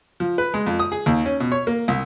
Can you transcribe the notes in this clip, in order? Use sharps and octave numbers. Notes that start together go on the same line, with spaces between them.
F3
B4
G#3
F2
D#6
G#4
D#2
C#4
B2
C#5
A#3
C2